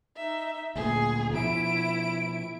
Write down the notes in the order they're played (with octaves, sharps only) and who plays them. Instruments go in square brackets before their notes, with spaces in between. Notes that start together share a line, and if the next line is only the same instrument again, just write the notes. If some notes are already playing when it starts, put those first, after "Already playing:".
[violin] D#4 E5
[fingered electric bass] D2 A#2 [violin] G#4
[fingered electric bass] B2 F3 [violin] E4 D7